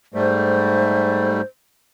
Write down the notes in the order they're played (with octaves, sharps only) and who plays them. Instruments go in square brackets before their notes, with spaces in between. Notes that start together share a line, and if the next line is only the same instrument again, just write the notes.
[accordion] G#2 G3 A3 [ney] C5